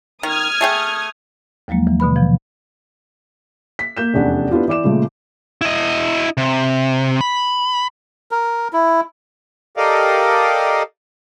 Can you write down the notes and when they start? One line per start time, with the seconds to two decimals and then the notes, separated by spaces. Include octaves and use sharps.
0.23 D#3 D#6 F6 G#6
0.61 A3 G#4 G5
1.68 D#2 F3 F#3 G#3 A#3
1.87 E3
2.00 B2 D3 B4 B5
2.16 C3 E3 F3
3.79 B6
3.97 A#3 G6 E7
4.14 F1 E2 C#4 D4 F#5
4.51 B3 D4 E4 F4 G4
4.68 E3 D5 D6 E7
4.84 A#2 C#3 F3 G#3 A3
5.61 E4 D#5
6.37 C3
7.21 B5
8.31 A#4
8.73 E4
9.77 G4 A4 A#4 D5 D#5 F5